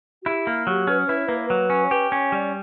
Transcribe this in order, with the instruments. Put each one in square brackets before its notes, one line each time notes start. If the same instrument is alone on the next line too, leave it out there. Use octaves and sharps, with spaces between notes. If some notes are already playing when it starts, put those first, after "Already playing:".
[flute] F#4
[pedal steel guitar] E4 [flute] G4
[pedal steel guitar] A#3
[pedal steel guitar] F#3 [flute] G4
[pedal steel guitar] C#4 [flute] B4
[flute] C#5
[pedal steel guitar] E4 [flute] B4
[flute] C#5
[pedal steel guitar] A#3 [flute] B4
[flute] C#5
B4
[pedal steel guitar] F#3
C#4
[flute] C#5
[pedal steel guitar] G4 [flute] B4
[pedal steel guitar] C#4 [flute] C#5
[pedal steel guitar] G3 [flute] D5